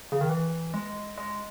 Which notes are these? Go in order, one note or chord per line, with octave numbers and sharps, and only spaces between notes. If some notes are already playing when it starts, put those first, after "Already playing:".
C#3
D#3
E3
G#3
G#3